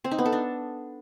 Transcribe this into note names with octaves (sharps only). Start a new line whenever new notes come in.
C4
D#4
B3
A4
D4